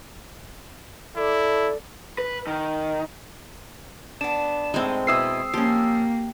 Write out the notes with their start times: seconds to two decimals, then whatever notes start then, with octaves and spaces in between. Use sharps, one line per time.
1.17 E4 A4 D5
2.18 B4
2.47 D#3
4.21 B3 D4 E7
4.74 A2 G#3 C4 D#4
5.07 B2 E4 B4 D#6 E6 C7
5.54 F3 A#3 C#4 G4